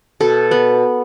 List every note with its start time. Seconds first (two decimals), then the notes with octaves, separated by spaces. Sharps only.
0.21 B2 A4
0.51 B3